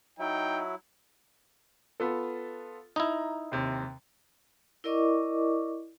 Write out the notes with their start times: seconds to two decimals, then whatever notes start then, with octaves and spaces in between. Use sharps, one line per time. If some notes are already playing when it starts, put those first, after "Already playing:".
0.19 F#3 D#4 E4 G5
2.00 B3 F4 A4
2.96 D#4 E4 A#5
3.52 D#2 C3
4.84 E4 A#4 D5 D#5 C#6 D6